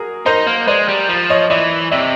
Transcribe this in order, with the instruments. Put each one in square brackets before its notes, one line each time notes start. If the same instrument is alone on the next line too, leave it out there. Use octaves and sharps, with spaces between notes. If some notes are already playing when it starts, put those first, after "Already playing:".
Already playing: [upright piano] F#4 G#4 A#4
[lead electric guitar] D#4 [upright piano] A#4 C5
[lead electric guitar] A#3
[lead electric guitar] G#3 [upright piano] C5 D5
[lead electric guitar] G3
F3
[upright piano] C#5 D#5
[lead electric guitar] E3 [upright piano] D5 E5
[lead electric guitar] C3 [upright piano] D5 E5